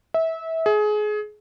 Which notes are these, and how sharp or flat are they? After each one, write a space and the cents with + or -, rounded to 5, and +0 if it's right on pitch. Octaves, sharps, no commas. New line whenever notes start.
E5 -25
G#4 +25